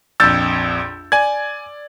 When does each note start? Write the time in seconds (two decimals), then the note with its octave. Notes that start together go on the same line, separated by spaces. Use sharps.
0.20 A#1 F2 E6 G6 A6
1.12 D5 G#5 G#6